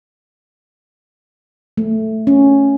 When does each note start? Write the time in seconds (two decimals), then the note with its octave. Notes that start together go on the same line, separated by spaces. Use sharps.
1.77 A3
2.27 C#4